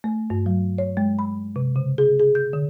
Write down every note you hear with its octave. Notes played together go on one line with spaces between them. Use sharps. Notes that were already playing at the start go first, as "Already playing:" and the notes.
A3
G2
F#3
C#5
G#3
B5
C3
C#3
G#4
G#4
G6
D3